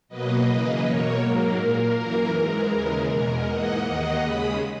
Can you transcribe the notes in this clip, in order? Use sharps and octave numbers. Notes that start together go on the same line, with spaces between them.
B2 F#3 A#3 B4 D#5
F#2 C#3 E3 A#3
B2 A#3 A#4 C#5
G#2 F#3 A#3 A#4
A#2 A#3
F#2 E3 A#3 A#4
G#2 E3 G#3
D#2 C#3 E3 G#3
E2 B2 G#3 A#4
G#2 E3 A#3 D#5 F#5
D#2 D#3 A#3
D#2 C#3 G#3 B5 D#6